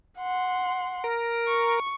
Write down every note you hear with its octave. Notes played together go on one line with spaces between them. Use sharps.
F#5 C6
A#4
C#6